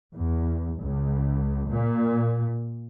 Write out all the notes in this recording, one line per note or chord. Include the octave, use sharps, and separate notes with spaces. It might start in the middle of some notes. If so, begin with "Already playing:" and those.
E2
C#2
A#2